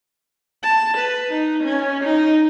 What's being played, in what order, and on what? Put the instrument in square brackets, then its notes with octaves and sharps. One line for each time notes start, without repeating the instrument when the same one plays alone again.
[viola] A5
B4
D#4
C#4
D#4